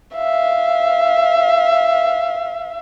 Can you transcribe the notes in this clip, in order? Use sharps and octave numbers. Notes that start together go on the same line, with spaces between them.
E5 F5